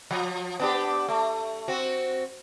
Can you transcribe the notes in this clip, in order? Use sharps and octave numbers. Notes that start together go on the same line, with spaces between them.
F3
B3 D4 G4
A3
C4 F#4